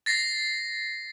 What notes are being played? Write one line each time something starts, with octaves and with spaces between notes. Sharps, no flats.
A6 A#6 C7